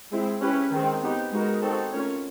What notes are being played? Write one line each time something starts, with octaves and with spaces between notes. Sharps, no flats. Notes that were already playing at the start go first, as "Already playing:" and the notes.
G#3 C4 E4 G#4
C#4 E4 G4 B4
D#3 G#3 C4
B3 D#4 G4
G#3 B3 D#4 F#4 A#4
C4 D#4 F#4 A4
A3 C#4 F4 A#4 C#5